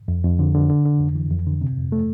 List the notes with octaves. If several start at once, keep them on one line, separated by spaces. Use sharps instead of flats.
F2
F2
D3
D3
D3
D3
F2
E3
F2
D3
C3
F2
A3